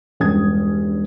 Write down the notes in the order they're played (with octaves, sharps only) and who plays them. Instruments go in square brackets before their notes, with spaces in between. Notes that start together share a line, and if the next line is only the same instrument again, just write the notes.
[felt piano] E1 G2 C#4 D#6 G#6